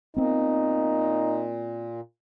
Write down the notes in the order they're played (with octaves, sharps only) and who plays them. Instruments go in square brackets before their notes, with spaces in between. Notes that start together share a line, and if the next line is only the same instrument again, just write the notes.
[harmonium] A#2 [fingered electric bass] B3 C4 [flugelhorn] D#4